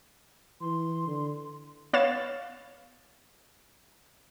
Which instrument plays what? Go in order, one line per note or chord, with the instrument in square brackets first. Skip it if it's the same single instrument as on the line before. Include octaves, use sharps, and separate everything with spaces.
[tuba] E3 [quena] C6
[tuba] D3
[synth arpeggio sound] B3 C#5 F5 A6 E7